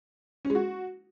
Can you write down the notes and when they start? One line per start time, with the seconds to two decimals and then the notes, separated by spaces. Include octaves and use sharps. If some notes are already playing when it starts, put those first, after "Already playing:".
0.45 C#4
0.50 G#3
0.55 F#4